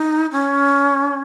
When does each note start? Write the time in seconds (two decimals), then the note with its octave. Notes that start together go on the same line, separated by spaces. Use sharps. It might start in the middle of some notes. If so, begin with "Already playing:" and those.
Already playing: D#4
0.32 C#4